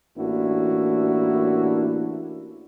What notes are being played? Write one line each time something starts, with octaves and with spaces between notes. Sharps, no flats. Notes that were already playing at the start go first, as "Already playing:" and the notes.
A1 A#3 D4 E4 F#4